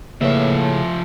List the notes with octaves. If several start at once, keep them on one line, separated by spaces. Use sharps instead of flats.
A2 C#3 F3 A#3 B4 C#5 E5